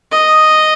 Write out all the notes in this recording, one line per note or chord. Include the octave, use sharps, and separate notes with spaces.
D#5